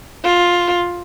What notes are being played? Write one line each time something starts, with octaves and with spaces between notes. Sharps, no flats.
F4